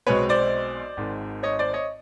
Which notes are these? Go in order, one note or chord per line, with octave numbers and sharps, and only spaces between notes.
B1 B2 G#3 C4 B4 C#5
C5 D5
G#1 G#2 D#3
C#5 D#5
C5 D5
C#5 D#5